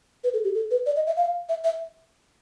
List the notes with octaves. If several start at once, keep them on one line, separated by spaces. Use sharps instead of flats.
B4
A4
G4
A4
B4
D5
D#5
E5
F5
E5
E5